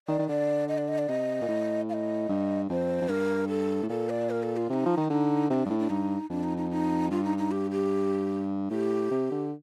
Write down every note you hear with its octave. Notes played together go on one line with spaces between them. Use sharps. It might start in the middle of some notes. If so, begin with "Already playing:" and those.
D#3 D5
D#3
D3 D5
D#5
D5
D#5
D5
C3 D#5
A#2
A2
F5
D#5
G2
F2 C5
F2
G2 A#4
A4
A2
A#2 A4
D5
A#4
A4
F4
C3 D#4 F4
F3
D#3
D3 D#4
C3 D4 D#4
G2
A2
D4
G2 D#4
F2 D4
D#4
D#4
D#4
G2 F4
D#4
D#4
G4
G4
A2 G4
C3
D3